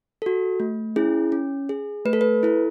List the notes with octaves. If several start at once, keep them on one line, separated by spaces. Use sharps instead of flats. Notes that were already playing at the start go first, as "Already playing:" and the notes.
F#4 A4
A3
C#4 E4 G#4
C#4
G#4
A3 B4
A4
B4
E4 A4